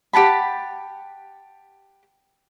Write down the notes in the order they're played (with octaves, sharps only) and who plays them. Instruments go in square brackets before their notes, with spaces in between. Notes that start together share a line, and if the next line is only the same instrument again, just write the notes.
[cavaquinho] G4 F#5 A5 B5